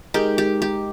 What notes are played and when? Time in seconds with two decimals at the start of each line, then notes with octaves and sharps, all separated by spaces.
0.14 G#3 D#4 G4 A#4
0.38 G4
0.62 G4